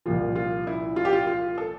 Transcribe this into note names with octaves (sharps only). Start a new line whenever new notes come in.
C2 A#2 F3 F4
F4
E4
F4
G4
F4
F4
A4